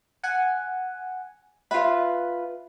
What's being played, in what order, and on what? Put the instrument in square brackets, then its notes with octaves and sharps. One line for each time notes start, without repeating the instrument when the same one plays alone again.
[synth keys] F#5 G#5
[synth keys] F4 B4 [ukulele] E5